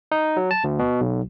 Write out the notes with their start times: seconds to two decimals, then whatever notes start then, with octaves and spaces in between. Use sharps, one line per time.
0.12 D#4
0.37 F#3
0.51 A5
0.64 D2
0.79 B2
1.01 B1